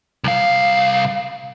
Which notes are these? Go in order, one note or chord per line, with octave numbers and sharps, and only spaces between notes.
C2 F5